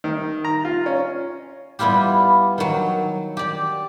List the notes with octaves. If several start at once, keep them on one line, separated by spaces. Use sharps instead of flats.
D#3
A#5
F4
C#4
G3 B3 E4 F4 G4
D#3 F#3
G4 D5